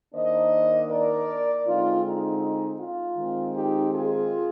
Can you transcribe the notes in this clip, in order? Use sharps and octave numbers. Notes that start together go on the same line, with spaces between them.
D#3 A#3 D4 C5 D#5
A#4 D5
D3 G#3 C4 D#4 F4
D#4
F4
D#3 G#3 C4
D#4 G4
F4 G#4